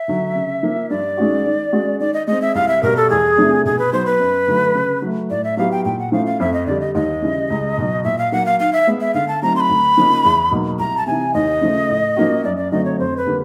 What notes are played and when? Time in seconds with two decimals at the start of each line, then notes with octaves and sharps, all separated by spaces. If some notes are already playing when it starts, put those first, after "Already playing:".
Already playing: E5
0.08 D3 F#3
0.35 C#3
0.63 F3 A#3
0.90 G2 D5
1.17 D#3 G#3 C#4 F#4
1.45 D#3
1.72 G#3 C#4 F#4
2.00 D#3 D5
2.14 D#5
2.27 G#3 C4 D#5
2.42 E5
2.55 C2 F5
2.68 E5
2.83 B2 G3 A#4
2.97 A4
3.10 E2 G#4
3.37 C3 F3 A3 D4
3.65 B2 G#4
3.79 B4
3.92 F#3 B3 D#4 C5
4.06 B4
4.20 F#2
4.47 D3 F#3 A3
4.75 C#3
5.02 F#3 A3
5.30 A2 D5
5.44 E5
5.57 F#3 B3 E4 G4 F5
5.71 G5
5.85 A#2 G5
5.99 F#5
6.12 F3 A3 C#4 E4 F5
6.26 F5
6.40 F2 E5
6.54 D#5
6.67 D3 G3 D5
6.81 D#5
6.95 D#2 D#5
7.22 C#3 E3 G3
7.50 C#2
7.78 B2 F#3
8.04 A#2 E5
8.18 F5
8.32 F#3 A#3 F#5
8.46 F5
8.60 D#3 F5
8.73 E5
8.87 G#3 B3
9.00 E5
9.14 D3 F5
9.28 A5
9.42 F#3 A3 C4 D#4 A#5
9.56 C6
9.60 B5
9.70 D2
9.97 C#3 F3 A#3 D#4
10.25 E2
10.51 B2 F#3 A#3 D#4
10.79 C2 A#5
10.98 A5
11.06 C3 E3 G#5
11.34 D#2 D#5
11.61 C#3 F3 A3
11.89 A2
12.17 F3 A#3 C#4 F#4
12.44 F#2 D5
12.57 D5
12.72 D3 F#3 A3 C4 D#5
12.85 C#5
12.99 F2 C5
13.17 B4
13.26 D3 G3 A#3